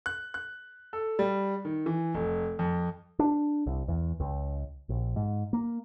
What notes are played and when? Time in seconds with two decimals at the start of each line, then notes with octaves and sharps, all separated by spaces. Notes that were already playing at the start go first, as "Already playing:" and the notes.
0.06 F#6
0.34 F#6
0.93 A4
1.19 G3
1.65 D#3
1.86 E3
2.14 F1
2.59 F2
3.19 D4
3.66 C2
3.88 E2
4.20 C#2
4.89 A#1
5.16 G#2
5.53 A#3